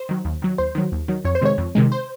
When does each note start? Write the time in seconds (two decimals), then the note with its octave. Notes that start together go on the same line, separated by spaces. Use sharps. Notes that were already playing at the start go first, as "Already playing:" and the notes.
Already playing: C5
0.09 D#3 F#3
0.25 D#2
0.42 D#3 F#3
0.58 D#2 C5
0.75 D#3 F#3
0.92 D#2
1.08 D#3 F#3
1.25 F2 C#5
1.35 C5
1.41 C3 D#3 G#3 C#5
1.58 F2
1.75 C3 D#3 G#3
1.92 C5